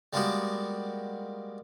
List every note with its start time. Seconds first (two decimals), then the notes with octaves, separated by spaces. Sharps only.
0.13 G3 G#3 A#3 B3 F#4 G4